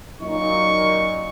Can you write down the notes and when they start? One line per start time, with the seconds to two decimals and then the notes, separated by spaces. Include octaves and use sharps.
0.21 F#2 A#2 D#4 C#6